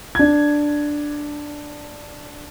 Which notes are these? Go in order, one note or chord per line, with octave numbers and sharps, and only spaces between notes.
D4 G#6